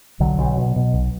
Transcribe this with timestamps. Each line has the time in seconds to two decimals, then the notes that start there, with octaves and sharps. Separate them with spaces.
0.20 B1 D3 F#3
0.38 B1
0.58 B2
0.76 B2
0.94 B1